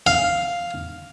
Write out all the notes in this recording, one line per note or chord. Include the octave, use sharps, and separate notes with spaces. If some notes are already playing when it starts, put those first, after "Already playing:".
F5